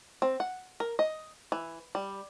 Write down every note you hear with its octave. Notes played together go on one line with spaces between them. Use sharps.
C4
F#5
A#4
D#5
E3
G3